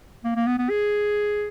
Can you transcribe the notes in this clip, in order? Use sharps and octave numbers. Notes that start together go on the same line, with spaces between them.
A#3
A#3
B3
B3
G#4